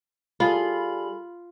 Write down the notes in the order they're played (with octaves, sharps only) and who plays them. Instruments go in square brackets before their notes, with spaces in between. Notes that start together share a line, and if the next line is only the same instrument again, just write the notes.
[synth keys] G3 G#4 A4 [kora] F4 [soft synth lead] B5